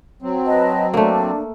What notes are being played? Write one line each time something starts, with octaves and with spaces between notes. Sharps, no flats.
F#3 C4
B4 D#5 A5
A3 A#3 D4